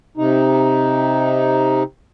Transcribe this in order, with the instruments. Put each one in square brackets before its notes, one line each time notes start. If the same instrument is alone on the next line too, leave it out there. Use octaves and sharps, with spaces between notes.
[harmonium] C3 D#4